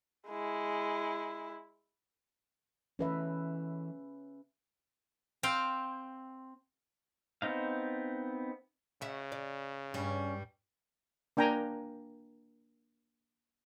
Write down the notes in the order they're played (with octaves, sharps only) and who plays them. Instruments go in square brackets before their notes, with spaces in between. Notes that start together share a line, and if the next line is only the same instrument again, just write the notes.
[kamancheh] G#3 E4
[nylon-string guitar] E3 A3 D#5 [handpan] C#4 B4 E5
[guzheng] C4 F5 G5
[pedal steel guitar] B3 C4 D#4 F5
[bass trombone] C#3 [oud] F#4 E5
[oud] D5
[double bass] G2 [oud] G3 [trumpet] C#4
[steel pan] A#3 D4 G5 G#5 A#5